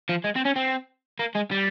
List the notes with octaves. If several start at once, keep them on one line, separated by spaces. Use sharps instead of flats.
F3
G#3
C4
C#4
C4
A#3
G#3
G3